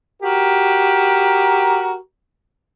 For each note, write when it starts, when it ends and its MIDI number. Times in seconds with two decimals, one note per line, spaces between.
0.22 1.97 66
0.22 1.97 67
0.22 1.97 70